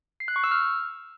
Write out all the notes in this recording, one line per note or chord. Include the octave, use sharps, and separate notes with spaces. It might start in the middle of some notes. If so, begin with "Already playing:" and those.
C7
F#6
C#6
E6
F6